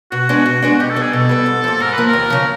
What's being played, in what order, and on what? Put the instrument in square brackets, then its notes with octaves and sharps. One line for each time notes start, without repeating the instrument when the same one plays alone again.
[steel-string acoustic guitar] B2 [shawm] F#4
[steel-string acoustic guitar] G#3 B3 D4
B2
G#3 B3 D4
[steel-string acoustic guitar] B2 [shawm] G4
[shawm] A4
[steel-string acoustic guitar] G3 B3
[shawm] G#4
[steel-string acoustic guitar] B2 [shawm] A4
[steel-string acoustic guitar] G3 B3
G#2
F3 A#3
[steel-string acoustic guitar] G#2 [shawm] A#4
[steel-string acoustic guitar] F3 A#3 [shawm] B4
[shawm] A#4
[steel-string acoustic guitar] D#2
C#3 F3